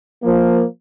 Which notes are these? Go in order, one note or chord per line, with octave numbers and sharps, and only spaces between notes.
F3 A#3